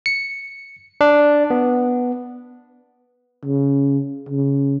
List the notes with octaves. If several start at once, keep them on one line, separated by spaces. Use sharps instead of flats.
C#7
D4
B3
C#3
C#3